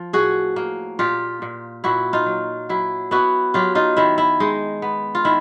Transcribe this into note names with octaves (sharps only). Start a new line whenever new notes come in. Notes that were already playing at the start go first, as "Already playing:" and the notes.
Already playing: F3
A2 F#4 G#4
A#3
A#2 F4 G4
A#2
A#2 E4 F#4
D#4 F4
F#3
F#3 E4
B3 E4 F#4
F#3 F4 G4
D#4 F4
D#3 E4
E4
G#3 D#4
B3
F4
D#3 E4